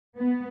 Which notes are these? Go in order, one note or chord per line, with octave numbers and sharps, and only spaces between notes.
B3